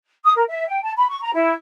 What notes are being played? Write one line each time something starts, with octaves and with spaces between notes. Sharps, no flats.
D#6
A#4
E5
G5
A5
B5
C#6
A#5
E4